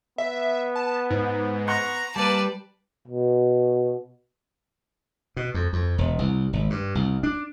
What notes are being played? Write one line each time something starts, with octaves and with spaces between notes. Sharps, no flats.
B3 E5
A5
G#2
F#5 A#5 C6 C#6
G3 A#3 B4 D5 A5
B2
B2
F2
F2
E1
C2
G#1
G2
C2
D4